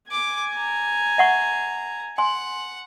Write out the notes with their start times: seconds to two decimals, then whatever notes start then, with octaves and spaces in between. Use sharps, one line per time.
0.12 G#5 D6
0.56 A#5
1.18 E5 F#5 C#6
2.18 F#5 G#5 C6